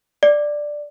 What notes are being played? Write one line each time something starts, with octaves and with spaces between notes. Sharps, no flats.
D5